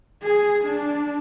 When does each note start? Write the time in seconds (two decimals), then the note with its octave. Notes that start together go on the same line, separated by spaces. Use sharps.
0.23 G#4
0.64 D4